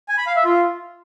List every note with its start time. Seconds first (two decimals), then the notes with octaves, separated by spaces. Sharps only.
0.09 G#5
0.18 B5
0.27 F5
0.36 E5
0.45 F4